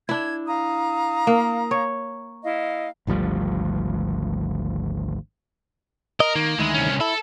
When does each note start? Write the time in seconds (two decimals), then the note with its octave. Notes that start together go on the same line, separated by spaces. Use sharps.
0.09 D4 E4 G#6
0.47 F5 A#5 D#6
1.27 A#3
1.71 C#5
2.43 E4 D#5 F5
3.07 G#1 D2 F3 G3
6.20 A#4 D#5
6.36 D#3 A#3
6.59 D2 D#3 G#3 E4
6.74 C2 C#4
7.01 E4 A4